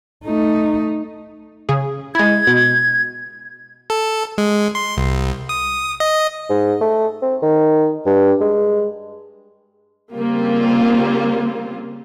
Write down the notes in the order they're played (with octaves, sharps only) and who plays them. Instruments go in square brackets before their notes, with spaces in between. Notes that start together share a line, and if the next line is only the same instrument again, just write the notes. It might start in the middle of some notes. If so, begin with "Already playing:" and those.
[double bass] A3 D#4
[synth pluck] C#3 G#4
[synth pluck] G#3 E4 [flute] G#6
[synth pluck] B2
[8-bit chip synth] A4
G#3
C6
C2
D#6
D#5
[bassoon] G#2
A3
C4
D#3
G2
G#3
[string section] C#3 G3 A#3 C4 F4